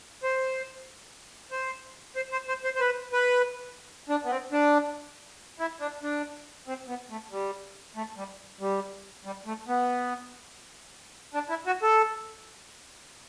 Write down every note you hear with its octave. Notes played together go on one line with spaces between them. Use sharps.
C5
C5
C5
C5
C5
C5
C5
B4
B4
D4
B3
C4
D4
E4
D4
D4
C4
B3
A3
G3
A3
G3
G3
G3
A3
B3
D4
E4
F#4
A4